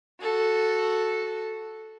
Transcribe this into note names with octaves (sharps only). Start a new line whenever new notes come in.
F#4 A4